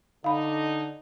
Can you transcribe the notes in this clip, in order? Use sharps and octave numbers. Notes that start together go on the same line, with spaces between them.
D3 D#4 F5 B5